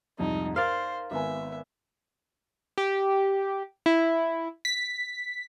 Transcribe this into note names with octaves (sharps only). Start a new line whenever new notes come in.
C2 F2 G#2 D#4
A#4 C5 D5 F5
G#1 B3 E5 G#5
G4
E4
B6